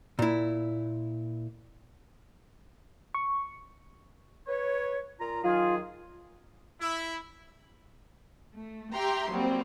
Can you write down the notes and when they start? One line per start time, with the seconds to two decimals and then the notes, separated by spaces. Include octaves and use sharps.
0.19 A#2 E4
3.15 C#6
4.47 B4 C#5
5.19 A#2 F4 A#5
5.44 D#3 F#3 F4 G#4
6.79 E4
8.54 A3
8.94 G4 E5 G5 A#5 C6
9.31 F#3 G3 A#3 C4